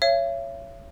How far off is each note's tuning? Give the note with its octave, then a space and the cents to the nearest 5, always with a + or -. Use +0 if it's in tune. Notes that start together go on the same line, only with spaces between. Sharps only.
C#5 +0 E5 +45